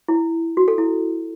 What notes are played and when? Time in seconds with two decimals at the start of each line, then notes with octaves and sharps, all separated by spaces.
0.08 E4
0.57 F#4
0.68 A4
0.78 E4